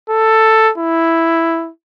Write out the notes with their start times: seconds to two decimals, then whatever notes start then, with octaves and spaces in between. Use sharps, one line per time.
0.10 A4
0.78 E4